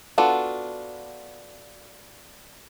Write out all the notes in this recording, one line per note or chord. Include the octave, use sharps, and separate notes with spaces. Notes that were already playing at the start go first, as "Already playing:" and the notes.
B3 D4 F4 F#4 A4